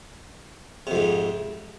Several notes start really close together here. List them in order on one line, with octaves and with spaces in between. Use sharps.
C3 F2 G#2